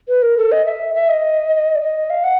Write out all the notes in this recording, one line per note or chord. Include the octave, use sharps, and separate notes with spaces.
B4
A#4
A4
D#5
E5
E5
D#5
D5
D#5
F5
F#5